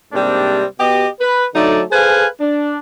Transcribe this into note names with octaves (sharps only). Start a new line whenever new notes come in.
G#2 C3 G3 A#3 C4 D4
B2 G4 D#5
B4
D3 F#3 A3 D#4 A4 D5
G#4 A4 B4 C5 F5 G#5
D4